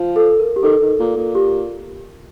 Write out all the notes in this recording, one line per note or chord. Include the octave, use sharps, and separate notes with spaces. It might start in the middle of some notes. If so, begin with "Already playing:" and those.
Already playing: F3
A4
A#4
G4
D#3 A4
D#3
A#2
A#2
G4